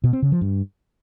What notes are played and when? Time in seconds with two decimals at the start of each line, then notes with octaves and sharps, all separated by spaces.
0.04 B2
0.13 C4
0.22 C#3
0.32 F3
0.41 G2